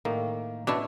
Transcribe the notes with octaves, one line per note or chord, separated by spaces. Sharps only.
A2 D#3 A#3
B2 D4 E4 C#5